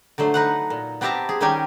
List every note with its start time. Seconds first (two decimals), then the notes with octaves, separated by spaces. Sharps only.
0.18 D3 F#3 A3 C5
0.34 D#4 B4 F#5
0.70 A#2
1.01 B3 C4 G4 E5 A5 A#5
1.29 G#4
1.40 D#3 G3 C#4 D#4 G4 G#5